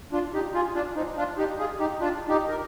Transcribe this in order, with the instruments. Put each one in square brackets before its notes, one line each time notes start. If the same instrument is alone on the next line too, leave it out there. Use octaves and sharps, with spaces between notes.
[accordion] D4 F4
D#4 G4
F4 G#4
D4 F4
C4 D#4
D4 F4
D#4 G4
F4 G#4
D#4 G4
D4 F4
D#4 G4
A#4